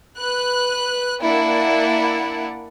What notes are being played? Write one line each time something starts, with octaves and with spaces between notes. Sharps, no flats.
B4 F#6
A#3 D4 E4 D5 F#5